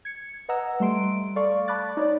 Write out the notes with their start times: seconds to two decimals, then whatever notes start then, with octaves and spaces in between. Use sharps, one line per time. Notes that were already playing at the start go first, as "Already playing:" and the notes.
0.05 G#6 C#7
0.49 B4 D#5 F#5 A#5 E6
0.80 G3 A3 C6 D7
1.36 A4 D5 F5 C#6
1.68 A5 B5 D6 F#6 A6
1.97 D#4 C#5 D5